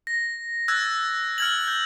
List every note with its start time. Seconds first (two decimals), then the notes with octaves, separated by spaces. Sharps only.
0.07 A#6
0.68 E6 F#6 G#6 A6
1.38 F6 G#6 F#7
1.68 G6